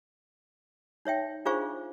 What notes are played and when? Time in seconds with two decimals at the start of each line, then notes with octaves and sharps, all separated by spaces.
1.05 D#4 C#5 E5 G5
1.45 D4 F4 G#4 C5 F5 C#6